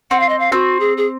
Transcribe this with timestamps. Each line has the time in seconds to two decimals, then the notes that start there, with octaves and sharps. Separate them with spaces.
0.11 C4 F#5
0.20 F5
0.29 D#5
0.39 F5
0.52 C4 F#4
0.80 G#4
0.97 G#4